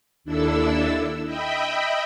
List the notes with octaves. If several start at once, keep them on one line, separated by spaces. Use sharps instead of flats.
D#2 D4 E4 A4 E6
D#5 E5 G5 B5